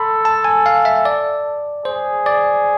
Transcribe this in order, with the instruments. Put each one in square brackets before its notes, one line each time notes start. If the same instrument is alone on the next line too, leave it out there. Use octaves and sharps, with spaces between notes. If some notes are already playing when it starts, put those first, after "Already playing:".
Already playing: [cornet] A4 [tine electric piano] B5 C6
[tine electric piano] A5
G#5
F5
E5
D5
[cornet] G#4 [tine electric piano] C5
[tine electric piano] D5